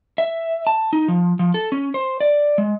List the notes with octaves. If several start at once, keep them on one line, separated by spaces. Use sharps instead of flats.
E5
A5
D#4
F3
F3
A4
C#4
C5
D5
G#3